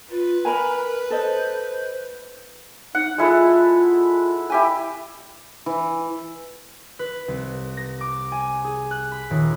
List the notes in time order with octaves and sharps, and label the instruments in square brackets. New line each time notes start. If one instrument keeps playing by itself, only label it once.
[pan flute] F4 [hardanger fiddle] B4
[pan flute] A#4 [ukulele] G#5 A#5 B5
[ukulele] A4 D#5 [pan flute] C5
[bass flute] D#4 [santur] F#5
[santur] G#3 E4 A4 [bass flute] F4
[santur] E4 G4 G#5
[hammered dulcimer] E3
[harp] B4
C2
A#6
D6
G#5
G#4
F#6
B5
D#1